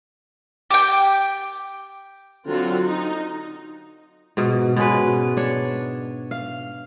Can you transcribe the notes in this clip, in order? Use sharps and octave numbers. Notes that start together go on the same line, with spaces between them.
G4 G5
D3 F#3 C4 F4
D#4
G#2 B2
B2 G#3 C#4 B4
D4 C#5
F5